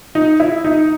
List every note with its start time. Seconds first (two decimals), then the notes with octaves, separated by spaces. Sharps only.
0.15 D#4
0.40 E4
0.64 D#4